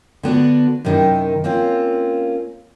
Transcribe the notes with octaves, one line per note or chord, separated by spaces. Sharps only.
D3 B3 D4 F#4
F#2 C3 D#3 C#4 D#4 E4
A#3 C4 C#4 F4